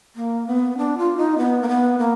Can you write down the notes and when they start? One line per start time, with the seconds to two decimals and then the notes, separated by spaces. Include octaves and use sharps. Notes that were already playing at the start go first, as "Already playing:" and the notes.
0.16 A#3
0.47 B3
0.77 D4
0.98 F4
1.17 D#4
1.38 B3
1.62 A#3
1.68 B3
1.98 A#3